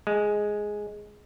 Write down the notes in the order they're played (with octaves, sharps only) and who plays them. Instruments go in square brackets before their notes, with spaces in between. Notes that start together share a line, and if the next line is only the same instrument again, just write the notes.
[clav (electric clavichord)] G#3